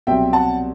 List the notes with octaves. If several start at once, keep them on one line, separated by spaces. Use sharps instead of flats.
C2 B2 F#3 C4 E5 G5
F#5 A5